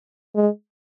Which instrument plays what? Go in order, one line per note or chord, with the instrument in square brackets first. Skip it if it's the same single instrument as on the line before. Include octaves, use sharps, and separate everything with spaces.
[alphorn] G#3